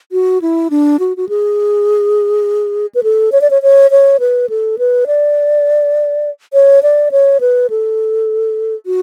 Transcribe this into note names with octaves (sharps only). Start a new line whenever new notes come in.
F#4
E4
D4
F#4
F#4
G#4
B4
A4
C#5
D5
C#5
C#5
C#5
B4
A4
B4
D5
C#5
D5
C#5
B4
A4
F#4